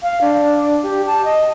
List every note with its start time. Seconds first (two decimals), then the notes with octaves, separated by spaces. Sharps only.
0.03 F5
0.21 D4
0.83 G4
1.07 A5
1.24 D#5